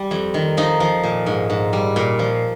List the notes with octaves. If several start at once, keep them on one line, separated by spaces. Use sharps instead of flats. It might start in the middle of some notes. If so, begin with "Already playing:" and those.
Already playing: G3
F2
D#3
F3 D#4
F3
A#2
G#2
G#2
G3
A#2
F3